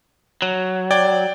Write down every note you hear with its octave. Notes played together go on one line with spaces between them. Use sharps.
F#3
D5 G5 G#6